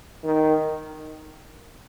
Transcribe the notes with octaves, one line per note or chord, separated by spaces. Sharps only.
D#3